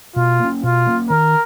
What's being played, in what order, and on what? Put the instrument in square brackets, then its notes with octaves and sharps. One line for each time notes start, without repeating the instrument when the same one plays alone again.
[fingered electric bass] B2 [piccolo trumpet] F4
[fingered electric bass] A#3 C#4
[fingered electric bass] B2 [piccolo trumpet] F4
[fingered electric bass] A#3 C#4
[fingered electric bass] D#3 [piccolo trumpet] A#4